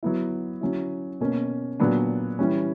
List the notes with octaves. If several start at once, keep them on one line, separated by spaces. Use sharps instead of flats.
F#3 B3 E4
F#3 C#4 E4
B2 A#3 C#4
A#2 F#3 B3 D4
E3 G3 C#4